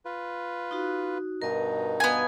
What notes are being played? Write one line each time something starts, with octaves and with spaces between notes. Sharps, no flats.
F4 B4
D#4 F#4
G2 B2 D#4 A#4 D#5
B3 D#5 F5 G#5